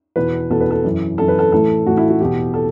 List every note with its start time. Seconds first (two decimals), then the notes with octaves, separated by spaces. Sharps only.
0.16 E2 B2 B4
0.50 E2 B2 A4
0.61 B4
0.71 A4
0.84 F#2 E3
1.18 F#2 E3 A4
1.28 B4
1.39 A4
1.52 A2 E3 A4
1.86 A2 E3 F#4
1.97 E4
2.09 F#4
2.20 E2 B2 G4
2.54 A4